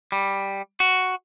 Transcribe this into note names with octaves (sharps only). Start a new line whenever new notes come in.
G3
F#4